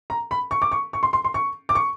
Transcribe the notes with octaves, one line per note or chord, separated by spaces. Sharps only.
A#5
B5
C#6
D6
C#6
C#6
C6
C6
C6
C#6
D6
C#6